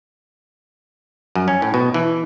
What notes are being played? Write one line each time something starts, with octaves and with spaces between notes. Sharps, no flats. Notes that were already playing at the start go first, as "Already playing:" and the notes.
F#2
C#4
A2
B2
E3